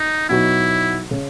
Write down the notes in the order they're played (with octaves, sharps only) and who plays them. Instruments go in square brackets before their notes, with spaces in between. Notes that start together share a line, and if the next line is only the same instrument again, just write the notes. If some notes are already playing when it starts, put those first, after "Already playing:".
Already playing: [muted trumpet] D#4
[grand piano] B2 F#3 B3 D#4 F#4 [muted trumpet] E4
[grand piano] C#3